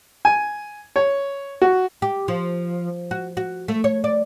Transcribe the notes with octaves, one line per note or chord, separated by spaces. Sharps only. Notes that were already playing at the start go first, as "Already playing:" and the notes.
G#5
C#5
F#4
G4
F3
F#4
F#4
A3
C#5
D5